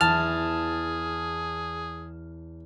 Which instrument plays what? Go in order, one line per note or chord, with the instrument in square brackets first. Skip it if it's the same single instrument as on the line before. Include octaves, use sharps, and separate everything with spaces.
[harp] E2 [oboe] G#4 [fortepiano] A5 [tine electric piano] F6